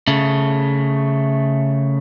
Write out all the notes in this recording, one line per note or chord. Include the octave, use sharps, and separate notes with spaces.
C#3 A3